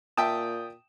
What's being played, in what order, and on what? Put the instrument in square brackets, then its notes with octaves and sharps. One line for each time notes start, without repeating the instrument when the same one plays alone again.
[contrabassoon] A#2 [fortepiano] E5 G5 A5 [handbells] D#6